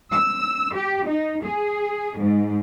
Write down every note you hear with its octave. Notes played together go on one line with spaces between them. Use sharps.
E6
G4
D#4
G#4
G#2